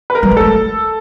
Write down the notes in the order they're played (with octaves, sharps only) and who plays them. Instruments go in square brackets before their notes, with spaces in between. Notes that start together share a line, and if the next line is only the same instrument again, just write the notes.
[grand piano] B4
A#4
[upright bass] G3
G#3
[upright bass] A3 [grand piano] A4